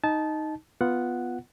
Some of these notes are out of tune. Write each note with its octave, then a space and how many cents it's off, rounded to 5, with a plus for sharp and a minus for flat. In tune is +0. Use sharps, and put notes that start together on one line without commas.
D#4 +0 A5 -20
B3 +0 F4 +0 F#5 +0